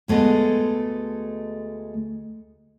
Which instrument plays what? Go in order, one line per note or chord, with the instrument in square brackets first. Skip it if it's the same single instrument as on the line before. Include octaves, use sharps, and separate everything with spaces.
[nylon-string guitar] D2 G#3 A3 B3 D#5